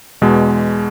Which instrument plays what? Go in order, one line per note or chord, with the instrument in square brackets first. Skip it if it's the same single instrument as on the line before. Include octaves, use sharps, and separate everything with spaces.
[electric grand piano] E2 B2 G#3